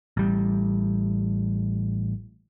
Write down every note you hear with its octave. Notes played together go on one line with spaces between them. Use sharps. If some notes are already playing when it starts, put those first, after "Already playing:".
A1 G3